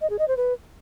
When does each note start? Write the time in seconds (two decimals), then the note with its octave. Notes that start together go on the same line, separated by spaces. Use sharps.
0.01 D#5
0.10 G#4
0.19 D#5
0.28 C5
0.37 B4